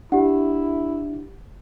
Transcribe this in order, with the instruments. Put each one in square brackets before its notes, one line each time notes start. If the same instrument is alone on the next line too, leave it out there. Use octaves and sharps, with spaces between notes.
[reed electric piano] D4 [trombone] E4 [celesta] G4 F#5